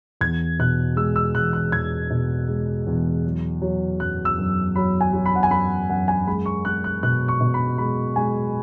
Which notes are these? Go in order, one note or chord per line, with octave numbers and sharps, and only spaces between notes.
E2 G#6
B2 F#6
G#3 E6
E6
E2 F#6
F#6
E2 G#6
B2
G#3
E2
F#3
F#3
F#2 F#6
E6
F#2
F#3 B5
G#5
F#3
B5
F#5
G#5
F#2 B5
F#2 F#5
G#5
G#3 B5
C#6
G#3 F#6
F#6
B2 F#6
C#6
B2
B5
G#3 B5
G#3 G#5